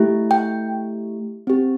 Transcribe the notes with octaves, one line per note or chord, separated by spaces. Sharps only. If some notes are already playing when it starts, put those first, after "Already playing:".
Already playing: A3 E4 G4
G5
C4 G4